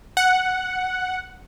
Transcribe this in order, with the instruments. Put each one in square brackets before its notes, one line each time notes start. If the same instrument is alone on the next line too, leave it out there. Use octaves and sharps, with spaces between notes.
[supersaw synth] F#5